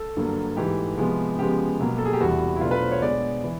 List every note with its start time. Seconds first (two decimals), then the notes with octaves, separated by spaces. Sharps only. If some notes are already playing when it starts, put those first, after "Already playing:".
Already playing: A4
0.17 G2 D3 F#3 A#3
0.57 G#2 E3 A3 G4
0.97 C3 F3 G#3 B3
1.38 C#3 F3 G#3 B3 G4
1.79 B2 F#3 A#3
1.98 A4
2.05 G#4
2.13 G4
2.20 E2 C3 E3 G3 B3 F#4
2.56 E4
2.61 B2 F#3 A3 D4 F4
2.71 B4
2.81 C5
2.92 C#5
3.02 B2 G#3 B3 D4 D5
3.44 E3